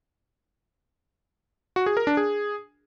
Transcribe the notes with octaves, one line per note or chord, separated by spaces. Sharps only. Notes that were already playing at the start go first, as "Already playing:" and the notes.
F#4
G#4
A#4
D4
G#4